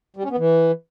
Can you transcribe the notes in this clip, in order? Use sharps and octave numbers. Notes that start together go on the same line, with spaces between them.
G3
C#4
B3
E3